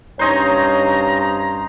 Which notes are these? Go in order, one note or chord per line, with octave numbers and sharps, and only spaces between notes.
G2 C#4 D#4 C5 C#5 A#5